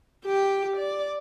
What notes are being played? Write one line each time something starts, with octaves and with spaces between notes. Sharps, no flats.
G4 G5
D5